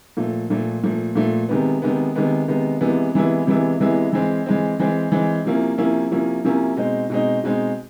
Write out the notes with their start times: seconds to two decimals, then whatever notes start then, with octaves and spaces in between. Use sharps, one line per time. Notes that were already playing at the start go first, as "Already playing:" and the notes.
0.17 A#2 F3 A3
0.50 A#2 F3 A3
0.84 A#2 F3 A3
1.15 A#2 F3 A3
1.49 C3 D#3 G#3 B3
1.82 C3 D#3 G#3 B3
2.16 C3 D#3 G#3 B3
2.48 C3 D#3 G#3 B3
2.81 C3 E3 G#3 B3 E4
3.14 C3 E3 G#3 B3 E4
3.46 C3 E3 G#3 B3 E4
3.80 C3 E3 G#3 B3 E4
4.13 E3 G#3 C4
4.46 E3 G#3 C4
4.80 E3 G#3 C4
5.12 E3 G#3 C4
5.45 C3 F3 A#3 C#4 E4
5.78 C3 F3 A#3 C#4 E4
6.11 C3 F3 A#3 C#4 E4
6.44 C3 F3 A#3 C#4 E4
6.77 B2 G#3 C4 D#4
7.10 B2 G#3 C4 D#4
7.44 B2 G#3 C4 D#4